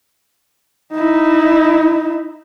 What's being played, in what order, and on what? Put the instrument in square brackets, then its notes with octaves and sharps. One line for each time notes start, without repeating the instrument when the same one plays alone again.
[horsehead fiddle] D#4 E4